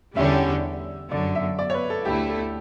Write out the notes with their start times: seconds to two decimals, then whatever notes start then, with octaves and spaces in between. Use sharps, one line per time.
0.16 E2 D3 G3 C#4 G4 E5
1.11 G1 F#2 D3 F#3 D5
1.35 E5
1.59 D5
1.70 C#5
1.74 B4
1.90 A4
2.05 D2 D3 A3 E4 G4
2.30 A4